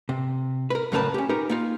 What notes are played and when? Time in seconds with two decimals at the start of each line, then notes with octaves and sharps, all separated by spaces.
0.09 C3
0.70 A#4 B4
0.92 F#2 A2 C#3 A#4 B4 A5
1.14 C#4 G4
1.29 D#4 G4 A#4 B4
1.49 A#3 D#4 F4